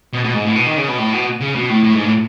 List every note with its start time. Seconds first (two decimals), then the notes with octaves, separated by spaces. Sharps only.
0.13 B2
0.24 B2
0.34 G#2
0.45 A2
0.55 B2
0.67 D#3
0.77 C#3
0.88 B2
0.98 A2
1.13 B2
1.41 C#3
1.55 B2
1.69 A2
1.84 A2
1.94 G#2
2.04 A2